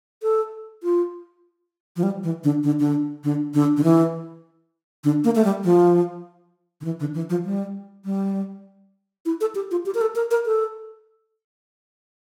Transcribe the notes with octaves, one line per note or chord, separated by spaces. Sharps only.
A4
F4
F3
G3
E3
D3
D3
D3
D3
D3
D3
E3
D3
A#3
A3
G3
F3
D3
E3
D3
E3
F3
G3
G3
E4
A4
G4
F4
G4
A#4
A4
A#4
A#4
A4